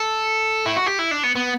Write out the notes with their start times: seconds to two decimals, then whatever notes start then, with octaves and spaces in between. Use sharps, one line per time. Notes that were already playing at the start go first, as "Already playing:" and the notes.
Already playing: A4
0.66 E4
0.76 F#4
0.86 G4
0.99 E4
1.11 D4
1.23 B3
1.36 B3